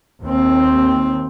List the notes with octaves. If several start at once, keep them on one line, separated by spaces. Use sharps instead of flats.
D#2 C4